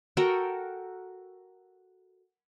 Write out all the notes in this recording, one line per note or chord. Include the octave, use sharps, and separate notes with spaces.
F#4 A4 A#4 G5